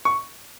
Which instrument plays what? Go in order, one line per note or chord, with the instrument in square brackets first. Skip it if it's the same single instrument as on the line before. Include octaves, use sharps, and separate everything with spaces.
[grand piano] C#6